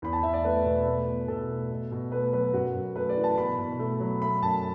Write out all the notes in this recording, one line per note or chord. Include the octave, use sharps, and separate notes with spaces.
E2 B5
A5
E2 E5
D5
A3 B4
B2
A3
B2
B2 A4
A3
B2
B2
A3 B4
F#3 B4
F#2 F#4
F#2
A3 B4
D5
E3
A5
B2 B5
B2
A3
F#3
A3 B5
F#2 A5